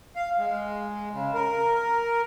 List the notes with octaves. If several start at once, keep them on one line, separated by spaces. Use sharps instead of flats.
F5
G#3
C#3
A#4